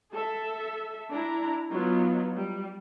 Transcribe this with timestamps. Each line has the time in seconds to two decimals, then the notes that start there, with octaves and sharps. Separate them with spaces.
0.12 A4 E5
1.11 D4 E4 A#5
1.70 F#3 B3 D#4 F4
2.36 G3